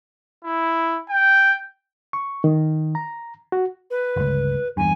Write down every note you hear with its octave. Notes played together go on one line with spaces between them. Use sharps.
E4
G5
C#6
D#3
A#5
F#4
B4
G1 C#2
E2 G2 G#5